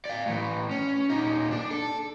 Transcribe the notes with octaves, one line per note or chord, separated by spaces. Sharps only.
D5 F5
A2 E3
C#4
A#2 D#4
D4
A4